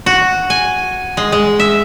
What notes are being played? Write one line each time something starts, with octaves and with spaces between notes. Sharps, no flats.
F#4
G#5
G#3
G#3
E5